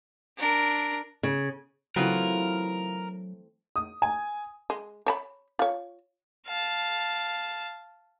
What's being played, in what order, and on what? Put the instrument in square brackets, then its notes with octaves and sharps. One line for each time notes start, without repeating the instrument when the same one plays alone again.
[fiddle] D4 A#4
[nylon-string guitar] C#3
[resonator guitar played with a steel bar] C#3 F4 F#4 [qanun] E3 A3 C4 [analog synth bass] F#3 [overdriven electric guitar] A#4
[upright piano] D#6
G#5
[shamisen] G#3
C#5 A5 B5
F4 C#5
[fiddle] F5 A5